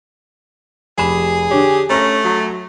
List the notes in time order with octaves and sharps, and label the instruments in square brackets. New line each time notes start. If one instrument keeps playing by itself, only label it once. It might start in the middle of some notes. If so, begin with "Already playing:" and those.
[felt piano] F1 B5 E7 [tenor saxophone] G4 [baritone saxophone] G#4
[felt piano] D3 D4 C#5 [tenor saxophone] G4
[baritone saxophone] A3 [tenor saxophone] C#4 [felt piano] A#5 A#6
[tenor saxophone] F#3